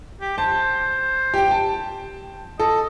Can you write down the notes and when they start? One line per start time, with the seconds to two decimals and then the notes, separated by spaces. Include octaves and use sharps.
0.21 G4
0.38 C5 A5
1.34 G4 G5
1.48 G5 A5
2.60 A4 D#5